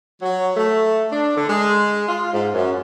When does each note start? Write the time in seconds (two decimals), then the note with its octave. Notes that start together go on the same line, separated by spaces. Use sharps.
0.22 F#3
0.57 A3
1.12 D4
1.36 D3
1.48 G#3
2.08 F4
2.33 G#2
2.54 F#2